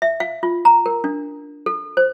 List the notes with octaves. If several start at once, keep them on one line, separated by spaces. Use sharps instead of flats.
E5
F5
F4
A#5
A#4
D4
A4
C5